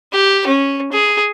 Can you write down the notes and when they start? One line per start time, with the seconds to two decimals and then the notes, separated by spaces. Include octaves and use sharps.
0.13 G4
0.47 C#4
0.92 G#4